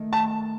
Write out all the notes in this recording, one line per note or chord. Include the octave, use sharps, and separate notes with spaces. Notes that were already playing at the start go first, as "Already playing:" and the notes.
Already playing: D#3 A3 D#4
A5